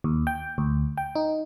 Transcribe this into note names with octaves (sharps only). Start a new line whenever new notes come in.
D#2
G5
D2
G5
D#4